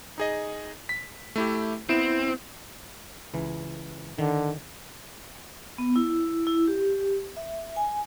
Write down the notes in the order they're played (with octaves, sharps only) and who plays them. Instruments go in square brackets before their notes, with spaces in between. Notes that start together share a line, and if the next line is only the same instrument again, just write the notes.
[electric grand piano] D#4 G#4 D#5
B6
A3 E4 G4
[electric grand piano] B3 D7 E7 [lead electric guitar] C4 [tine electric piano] E4
[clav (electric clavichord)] C#2 E3
[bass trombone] D3 [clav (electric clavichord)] D#3
[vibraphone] B3
E4
E4
G4
E5
G#5